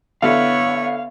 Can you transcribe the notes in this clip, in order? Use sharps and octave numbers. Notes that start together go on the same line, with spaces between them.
D3 B3 E4 C#5 F5